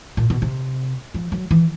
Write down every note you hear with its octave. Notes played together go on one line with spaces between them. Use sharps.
A#2
B2
C3
F3
F#3
E3